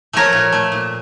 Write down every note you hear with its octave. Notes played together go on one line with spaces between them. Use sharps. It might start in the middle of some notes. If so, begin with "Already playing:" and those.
F3 A3 A#4 C#5
A#2
A3
A#2